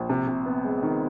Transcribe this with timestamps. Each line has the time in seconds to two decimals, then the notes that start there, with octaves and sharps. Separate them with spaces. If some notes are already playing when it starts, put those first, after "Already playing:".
Already playing: A#1
0.10 C3
0.27 C3
0.46 B3
0.64 G#3
0.83 D#3